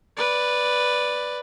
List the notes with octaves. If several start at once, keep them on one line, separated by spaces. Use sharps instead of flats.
B4 D5